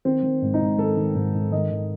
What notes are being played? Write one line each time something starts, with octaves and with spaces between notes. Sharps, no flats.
D#3 C4
D#3
G#2
D#4
G#2
D#3 A4
D#3
G#2
G#2
D#3 D#5
D#3